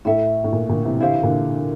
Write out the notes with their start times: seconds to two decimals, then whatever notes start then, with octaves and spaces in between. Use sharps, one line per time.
0.05 A2 E4 A4 E5
0.44 A2
0.53 A#2
0.69 A#2 D3
0.85 C3 E3
1.00 D3 E4 G4 C5 F5
1.12 E3
1.23 A#2 D3